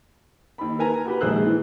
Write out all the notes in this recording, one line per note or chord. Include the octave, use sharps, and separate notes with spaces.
D#2 B5
A#4 B4 G#5 A#5
F#4 G4 B4
A#1 G#2 G#4 C5 E6 F#6
E3